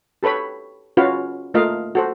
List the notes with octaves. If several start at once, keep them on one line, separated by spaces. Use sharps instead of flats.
G4 A4 B4 C#5 B5
C#4 F4 F#4 B4 C#5 F5
A3 A#3 F4 A#4 D#5 F5
F#4 A4 C5